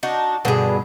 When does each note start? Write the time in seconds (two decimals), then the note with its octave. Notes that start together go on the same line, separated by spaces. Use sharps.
0.03 D4 D#4 F#4
0.45 G2 B2 D3 G#4